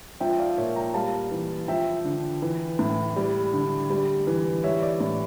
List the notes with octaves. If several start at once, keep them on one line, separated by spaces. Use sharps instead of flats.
F3 E5 G5
D5 F5
A#2 C#5 E5
G5 A#5
G3 F5 A5
E3
F3 E5 G5
D3
E3
A2
G3
D3
G3
E3
G3 C#5 E5
D5
A2 D5